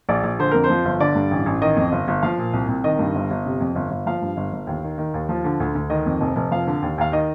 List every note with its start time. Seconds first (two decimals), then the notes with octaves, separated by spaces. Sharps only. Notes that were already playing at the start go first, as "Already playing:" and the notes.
0.09 A#1 D5
0.23 A#1
0.39 D3 C5
0.51 F2 A#4
0.64 C5
0.70 F3
0.85 G1
1.00 D3 D5
1.15 G2
1.31 A1
1.46 A1
1.61 D#3 D#5
1.76 F2
1.92 G1
2.08 G1
2.23 F3 F5
2.38 A#2
2.53 C2
2.68 C2
2.84 D#3 D#5
2.99 G2
3.15 G1
3.30 G1
3.46 C3
3.61 F2
3.75 G1
3.91 G1
4.06 F3 F5
4.22 G2
4.37 G1
4.53 G1
4.67 D#2
4.83 D#3
4.98 D#3
5.14 D#2
5.29 F3
5.44 D3
5.60 D2
5.75 D2
5.90 D#3 D#5
6.06 F2
6.21 F1
6.36 F1
6.51 F3 F5
6.67 D3
6.82 D#2
6.98 D#2 F5
7.12 D#3 D#5